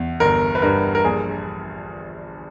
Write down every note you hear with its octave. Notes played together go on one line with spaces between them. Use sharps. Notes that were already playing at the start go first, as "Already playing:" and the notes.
Already playing: E2
G1 A#4
B4
G2 A#4
A#4
A#1 G#4